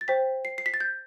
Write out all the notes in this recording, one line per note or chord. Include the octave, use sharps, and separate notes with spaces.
A6
C5 G5 B6
C7
C7
B6
A6
G6